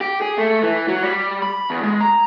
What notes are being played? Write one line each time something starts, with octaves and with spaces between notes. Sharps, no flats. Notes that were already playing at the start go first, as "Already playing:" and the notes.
G4
G#4
A3
E3
F#3
G3
B5
E2
G#3
A#5